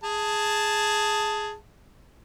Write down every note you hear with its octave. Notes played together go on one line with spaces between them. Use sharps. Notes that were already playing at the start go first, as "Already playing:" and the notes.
G#4 A5